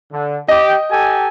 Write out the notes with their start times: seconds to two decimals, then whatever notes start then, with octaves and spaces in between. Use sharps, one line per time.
0.12 D3
0.48 G4 D#5
0.90 G4 A4 G#5